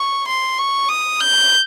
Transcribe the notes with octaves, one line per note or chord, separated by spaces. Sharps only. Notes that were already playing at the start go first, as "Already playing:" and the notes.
Already playing: C#6
C6
C#6
D#6
G6